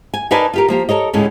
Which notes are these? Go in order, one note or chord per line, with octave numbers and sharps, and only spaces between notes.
G#5
D#4 A#4 B4 D5 G#5 A5
F4 G4 A#4
F3 A#3 G4
A4 A#4 C#5 D#5
D2 A2 G#3 C#4